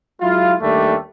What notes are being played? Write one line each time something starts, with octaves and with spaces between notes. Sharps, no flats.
F#3 G#3 E4 F4
D#2 D#3 G3 A3 D4